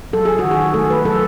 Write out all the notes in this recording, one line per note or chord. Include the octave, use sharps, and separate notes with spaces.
F#3 A4
G#4
F#4
D#3
G#4
A3 A4
B4
F#3 A4